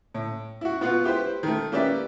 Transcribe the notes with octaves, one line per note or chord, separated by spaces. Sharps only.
A2
E4 F#4
B3 F4 F#4 B4 F5 F#5
E4 G4 B4 C5
D#3 A3
A#3 C#4 G4 B4 D5 E5